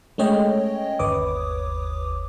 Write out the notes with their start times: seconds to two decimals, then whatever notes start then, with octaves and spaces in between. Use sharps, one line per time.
0.18 G#3 A3 C#4 C#5 D#5 G5
0.99 G1 D#2 B4 C#5 D6 D#6